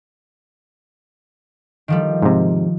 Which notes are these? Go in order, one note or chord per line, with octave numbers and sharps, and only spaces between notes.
D#3 F3 G3
G#2 C3